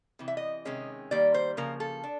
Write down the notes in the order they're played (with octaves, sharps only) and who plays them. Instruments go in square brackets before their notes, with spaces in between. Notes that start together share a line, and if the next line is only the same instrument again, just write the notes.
[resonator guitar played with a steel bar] C3 E3
E5
D#5
C3 D#3 G#3 C#4
D#3 G3 A#3 D5
C5
C#3 F3 A#3 A#4
A4
D4